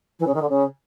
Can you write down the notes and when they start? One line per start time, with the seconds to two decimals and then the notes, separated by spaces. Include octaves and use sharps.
0.19 E3
0.27 C#3
0.34 D#3
0.42 D3
0.49 C#3